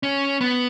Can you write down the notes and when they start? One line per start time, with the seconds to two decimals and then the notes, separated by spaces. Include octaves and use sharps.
0.03 C#4
0.41 B3